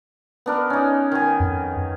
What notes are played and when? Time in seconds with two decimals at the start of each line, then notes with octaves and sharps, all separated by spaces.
0.46 B3 D4 A#4
0.70 C#4 D#4
1.12 D#3 G#5
1.40 F2